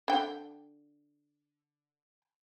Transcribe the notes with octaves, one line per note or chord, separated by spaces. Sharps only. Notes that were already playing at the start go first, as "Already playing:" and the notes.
D3 G5